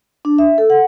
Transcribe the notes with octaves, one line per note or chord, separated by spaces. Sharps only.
D4
E5
A4
F#5